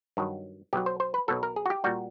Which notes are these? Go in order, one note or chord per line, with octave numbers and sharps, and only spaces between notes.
G2 D#3 F#3
B1 B2 F#3 G4
C5
C5
B4
B1 B2 F#3 A4
A#4
G#4
F#4
G4
A#2 G3 F#4